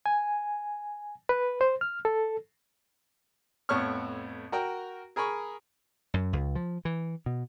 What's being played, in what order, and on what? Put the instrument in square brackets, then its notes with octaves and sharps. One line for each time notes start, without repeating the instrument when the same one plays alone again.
[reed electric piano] G#5
B4
C5
F6
A4
[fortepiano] F2 A2 B3 C#5 C#6 F6
F#4 A#4 G5 A#5
G#4 A#4 G#5 B5 C#6
[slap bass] F#2
C#2
F3
E3
B2